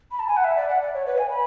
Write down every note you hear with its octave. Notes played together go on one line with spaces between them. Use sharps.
B5
A5
G#5
F#5
E5
D5
F#5
D5
C#5
B4
G#5
B5